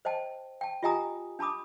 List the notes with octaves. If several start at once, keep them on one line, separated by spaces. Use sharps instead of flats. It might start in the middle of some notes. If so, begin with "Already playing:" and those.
C5 D#5 G5 A5
G5 A5
F4 G4 D#5 G#5 A#5 D#6
D4 A5 B5 D6 D#6